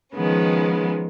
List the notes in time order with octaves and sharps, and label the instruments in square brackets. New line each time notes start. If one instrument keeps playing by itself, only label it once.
[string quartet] D#3 F3 G#3 B3 C#4